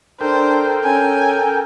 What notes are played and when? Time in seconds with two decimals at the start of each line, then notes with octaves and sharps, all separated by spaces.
0.21 D4 A4 A#4 C5 G5
0.84 C#4 G#5